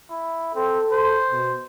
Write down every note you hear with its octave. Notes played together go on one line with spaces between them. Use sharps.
E4
C4 A4
C5
B2